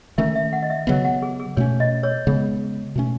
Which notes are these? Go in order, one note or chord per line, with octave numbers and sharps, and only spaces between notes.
D#3 A3 C#4 E5
E5
F#5
D#5
E5
C#3 F#3 B3 F#5
F#5
G#4
G#4
B2 A3 C#4 C#5
D#5
C#5
C#3 G#3 B3
B2 A3 C#4